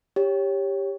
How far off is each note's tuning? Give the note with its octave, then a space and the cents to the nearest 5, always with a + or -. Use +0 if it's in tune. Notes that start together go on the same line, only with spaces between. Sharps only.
G4 +10 C#5 +0